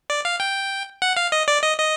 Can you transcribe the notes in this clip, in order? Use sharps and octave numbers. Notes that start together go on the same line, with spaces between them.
D5
F5
G5
F#5
F5
D#5
D5
D#5
D#5